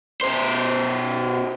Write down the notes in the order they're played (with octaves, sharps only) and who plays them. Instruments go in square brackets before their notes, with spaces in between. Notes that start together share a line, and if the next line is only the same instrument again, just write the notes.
[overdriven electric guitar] B2 C5